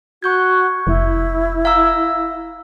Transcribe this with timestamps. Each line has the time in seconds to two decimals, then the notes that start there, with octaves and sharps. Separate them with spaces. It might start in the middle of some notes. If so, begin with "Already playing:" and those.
0.23 F#4 C#6 G6 G#6
0.87 F1 E4
1.65 F5 A#5 E6